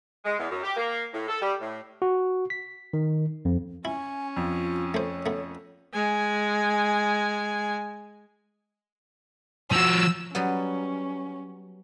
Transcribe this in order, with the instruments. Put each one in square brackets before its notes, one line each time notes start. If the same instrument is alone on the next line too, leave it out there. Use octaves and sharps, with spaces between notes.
[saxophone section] G#3
E2
F#2
G4
A#3
A2
A4
G3
A2
[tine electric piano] F#4
B6
D#3
F2
[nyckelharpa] C#4 [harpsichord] E4 [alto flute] G#5
[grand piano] F2 [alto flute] F4
[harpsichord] A3 C5 [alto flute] C#5
[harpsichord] A3 B3
[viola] G#3 G#5
[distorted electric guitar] F3 F#4 [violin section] E6
[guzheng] F#3 G3 B3 [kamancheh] C#4